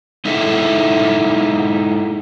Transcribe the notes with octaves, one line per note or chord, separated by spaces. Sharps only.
G#3 D#4 E4 G#4 A4